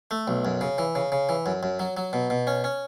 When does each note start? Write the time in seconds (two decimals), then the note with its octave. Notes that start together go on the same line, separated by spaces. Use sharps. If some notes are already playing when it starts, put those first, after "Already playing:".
0.11 A3
0.28 B1
0.45 F#2
0.61 C#3
0.78 E3
0.95 C#3
1.12 C#3
1.29 E3
1.46 F#2
1.63 F#2
1.79 F#3
1.97 F#3
2.13 B2
2.30 B2
2.47 C#4
2.64 C#4